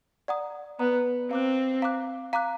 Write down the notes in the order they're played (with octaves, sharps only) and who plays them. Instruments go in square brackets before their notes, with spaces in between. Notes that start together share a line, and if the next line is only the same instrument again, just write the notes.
[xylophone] D5 F#5 A#5 D#6
[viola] B3 [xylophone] D5 F#5 A#5 D#6
[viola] C4 [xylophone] F5 A#5 D6 F#6
[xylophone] F5 A#5 D6 F#6
F5 A#5 D6 F#6